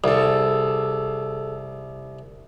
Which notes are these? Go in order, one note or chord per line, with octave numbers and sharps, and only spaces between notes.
C2 G#4 A4